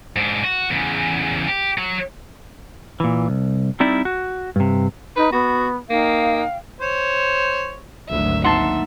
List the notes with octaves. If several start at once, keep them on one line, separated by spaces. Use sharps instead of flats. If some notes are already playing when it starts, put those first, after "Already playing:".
G#2 D4
F#4
E2 C#3
G4
F#3
A#2 E3
C2
G3 C4 D#4 E4 D5
F#4
G2 C3
D#4 B4
B3 F#4
A#3 D#4 F5 G5
C5 C#5
G#1 D2 F#3 E5
A#3 D#4 E5 F#5 A5 C6